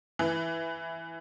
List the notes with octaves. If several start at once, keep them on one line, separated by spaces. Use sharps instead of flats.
E3